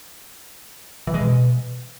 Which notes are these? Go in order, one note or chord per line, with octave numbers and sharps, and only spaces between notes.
E3
G#3
B2